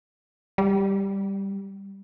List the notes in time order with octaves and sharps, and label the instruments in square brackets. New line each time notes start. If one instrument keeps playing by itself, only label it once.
[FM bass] G3